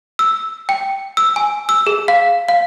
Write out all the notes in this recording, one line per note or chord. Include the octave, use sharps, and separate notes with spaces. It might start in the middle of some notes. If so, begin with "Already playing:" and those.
E6
G5
E6
G#5
E6
G#4
F5
F5